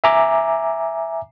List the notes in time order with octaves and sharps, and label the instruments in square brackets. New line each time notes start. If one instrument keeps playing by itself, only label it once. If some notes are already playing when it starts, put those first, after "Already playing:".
[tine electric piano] E5 G#5 A#5 D6